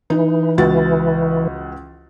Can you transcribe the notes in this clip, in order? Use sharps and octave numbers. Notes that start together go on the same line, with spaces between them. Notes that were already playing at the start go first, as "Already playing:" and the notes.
E3 D#4
C#2 F#4 A6